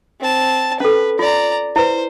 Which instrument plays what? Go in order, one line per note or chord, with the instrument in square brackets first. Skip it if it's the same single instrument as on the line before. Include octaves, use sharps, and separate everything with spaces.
[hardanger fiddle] C4 A5
[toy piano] C#4 A4 [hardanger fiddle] B4
[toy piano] F4 [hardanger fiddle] D5 A#5
[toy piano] E4 B4 [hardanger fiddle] C5